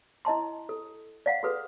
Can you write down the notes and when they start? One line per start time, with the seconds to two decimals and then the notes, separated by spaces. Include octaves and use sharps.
0.25 E4 D#5 A5 C6
0.69 A4
1.26 D5 F5 F#5
1.43 F#4 G#4 A4 B4